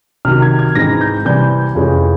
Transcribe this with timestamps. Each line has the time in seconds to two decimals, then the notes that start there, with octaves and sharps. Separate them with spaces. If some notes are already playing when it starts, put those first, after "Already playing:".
0.25 C3 D#3 F#3 F6
0.42 G#6
0.59 G#6
0.75 G#2 E3 G#3 C4 D#4 A#6
1.01 G6
1.25 C3 E3 G3 C4 G6
1.75 F2 C3 E3 G#3 C#4